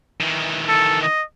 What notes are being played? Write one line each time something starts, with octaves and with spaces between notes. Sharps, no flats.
D#3 E3
A4
D#5